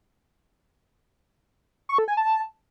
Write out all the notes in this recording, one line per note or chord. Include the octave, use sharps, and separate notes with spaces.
C#6
A4
G#5
A5